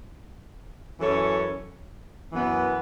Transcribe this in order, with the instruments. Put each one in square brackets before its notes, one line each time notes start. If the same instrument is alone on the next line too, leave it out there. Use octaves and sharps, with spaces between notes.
[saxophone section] F#2 E3 C#4 A4 C#5
F#2 E3 B3